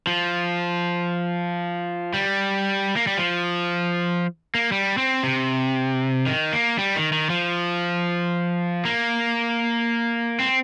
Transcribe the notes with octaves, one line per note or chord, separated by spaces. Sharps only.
F3
G3
A#3
G3
F3
A#3
G3
C4
C3
D#3
A#3
G3
D#3
D#3
F3
A#3
C4